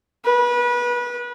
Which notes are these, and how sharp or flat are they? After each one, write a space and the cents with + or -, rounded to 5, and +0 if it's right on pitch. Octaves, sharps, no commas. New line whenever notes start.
B4 -25